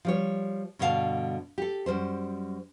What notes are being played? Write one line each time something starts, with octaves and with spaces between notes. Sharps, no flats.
F3 G3 C#5
G2 B2 D3 F4 F5 A5
G4 A4
F#2 B2 G3 C5